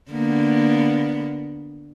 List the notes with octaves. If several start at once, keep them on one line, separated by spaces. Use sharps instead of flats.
D3 A#3 B3